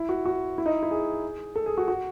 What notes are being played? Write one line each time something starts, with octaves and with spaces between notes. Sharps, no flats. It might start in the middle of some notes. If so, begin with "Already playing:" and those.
Already playing: E4
F#4
F#4
E4
D#4
E4
G#4
A4
G#4
F#4
F#4